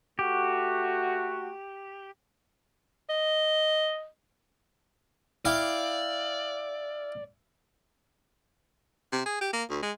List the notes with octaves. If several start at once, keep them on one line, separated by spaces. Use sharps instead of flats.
A3 F#4 G4
D#5
E4 D5 F5 G5
C3
G#4
G4
A#3
D2
G#3